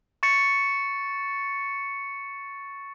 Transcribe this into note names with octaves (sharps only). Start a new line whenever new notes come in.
C#6 A6 C#7